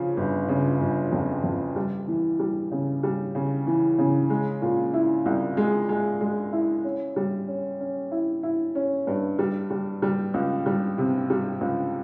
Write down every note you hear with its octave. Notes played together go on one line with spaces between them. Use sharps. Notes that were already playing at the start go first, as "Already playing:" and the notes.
Already playing: C#3 F3
G1
C#3
G1
F2
F2
G3
E3
G3
C#3
G3
C#3
E3
C#3
G#3
A#2
E4
C2
G#3
G#3
G#3
E4
C#4
G3
C#4
C#4
E4
E4
C#4
G2
G3
G3
G3
C#2
G3
C3
G3
C#2